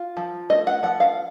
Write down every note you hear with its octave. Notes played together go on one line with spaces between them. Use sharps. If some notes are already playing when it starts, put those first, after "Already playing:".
Already playing: F4
F3
A3 D#5
F#5
F3 F#5
F5